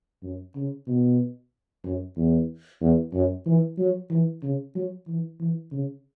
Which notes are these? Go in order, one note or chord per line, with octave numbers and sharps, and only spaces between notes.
F#2
C#3
B2
F#2
E2
E2
F#2
E3
F#3
E3
C#3
F#3
E3
E3
C#3